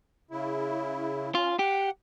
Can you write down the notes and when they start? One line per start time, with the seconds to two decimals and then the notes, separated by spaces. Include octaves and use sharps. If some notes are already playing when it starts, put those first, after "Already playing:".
0.31 C#3 E4
1.35 C#4 F4
1.59 G4 F#5